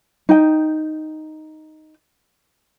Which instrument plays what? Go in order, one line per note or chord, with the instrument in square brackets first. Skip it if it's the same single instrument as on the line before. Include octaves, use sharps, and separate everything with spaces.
[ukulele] D#4 G5